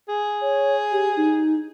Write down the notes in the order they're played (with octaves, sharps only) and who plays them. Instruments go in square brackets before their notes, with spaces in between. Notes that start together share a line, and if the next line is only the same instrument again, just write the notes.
[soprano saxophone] G#4
[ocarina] C#5
G4
D#4